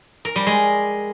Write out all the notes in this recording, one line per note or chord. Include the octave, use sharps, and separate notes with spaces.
A#4
G3
G#3